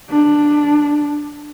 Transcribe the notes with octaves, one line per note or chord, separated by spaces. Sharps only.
D4